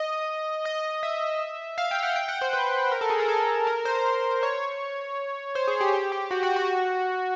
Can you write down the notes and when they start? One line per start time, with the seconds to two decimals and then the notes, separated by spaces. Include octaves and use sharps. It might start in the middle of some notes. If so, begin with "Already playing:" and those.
Already playing: D#5
0.65 D#5
1.03 E5
1.78 F5
1.91 G5
2.03 F#5
2.16 G5
2.28 F#5
2.41 C5
2.53 B4
2.92 A#4
3.01 A4
3.10 G#4
3.20 A#4
3.28 A4
3.67 A#4
3.85 C5
4.43 C#5
5.55 C5
5.68 G#4
5.81 G4
5.94 G4
6.12 G4
6.31 F#4
6.43 F#4
6.56 F#4